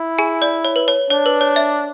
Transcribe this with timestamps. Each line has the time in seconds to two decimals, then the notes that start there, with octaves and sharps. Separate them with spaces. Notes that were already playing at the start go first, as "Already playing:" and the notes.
Already playing: E4
0.19 G#4 G#5
0.42 D5
0.65 C#5
0.76 B4
0.88 C#5
1.10 D4 C#5
1.26 B4
1.41 C#5
1.56 E5